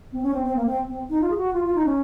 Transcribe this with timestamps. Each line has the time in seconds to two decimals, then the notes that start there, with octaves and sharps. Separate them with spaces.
0.13 C4
0.23 C#4
0.34 C4
0.44 C4
0.56 A#3
0.66 C4
0.88 C4
1.10 D#4
1.21 F4
1.30 G#4
1.37 F#4
1.53 F4
1.64 F4
1.75 D#4
1.86 C#4